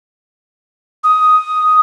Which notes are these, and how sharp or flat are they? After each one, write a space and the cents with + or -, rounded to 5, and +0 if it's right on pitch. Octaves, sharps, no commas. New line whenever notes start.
D#6 +5